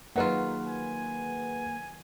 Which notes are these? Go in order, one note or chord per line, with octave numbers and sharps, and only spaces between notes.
D#3 F#3 A#3 F4 G#4 B4 F#5
G#5